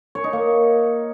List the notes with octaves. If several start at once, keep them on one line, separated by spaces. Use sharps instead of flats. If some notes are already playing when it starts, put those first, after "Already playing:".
C#5
D#4
A#3